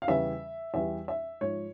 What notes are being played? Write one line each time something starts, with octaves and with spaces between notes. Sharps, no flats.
F5
E2 C#3 E3 G3 E5
E2 E3 G3 E5
E5
G#2 F3 C#5